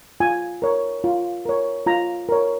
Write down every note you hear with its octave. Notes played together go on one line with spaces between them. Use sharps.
F4 G#5
A#4 C#5
F4
A#4 C#5
F4 A#5
A#4 C#5